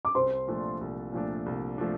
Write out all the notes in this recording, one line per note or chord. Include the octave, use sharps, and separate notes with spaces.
D6
C2 C5 C6
A#2 F3 A3 D4
C2
A#2 F3 A3 D4
C2
F3 A3 D4